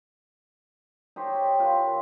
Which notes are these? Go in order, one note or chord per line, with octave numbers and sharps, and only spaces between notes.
D#4 G4 C5 C#5
E5
F4 B4
D#3